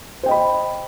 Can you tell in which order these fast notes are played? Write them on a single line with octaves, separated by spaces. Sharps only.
C5 G5 D#5 B5